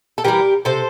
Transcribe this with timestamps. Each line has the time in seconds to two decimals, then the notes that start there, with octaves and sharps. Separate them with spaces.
0.18 A4
0.24 E3 G3 G4 A#4
0.65 C3 A4 C5